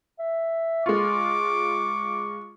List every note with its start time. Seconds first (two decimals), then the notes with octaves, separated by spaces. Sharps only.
0.19 E5
0.86 G#3 F4 C#6 D6